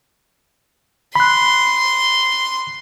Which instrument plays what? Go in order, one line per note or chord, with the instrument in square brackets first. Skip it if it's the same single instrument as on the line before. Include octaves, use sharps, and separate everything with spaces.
[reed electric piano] B5 F#6 [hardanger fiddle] C6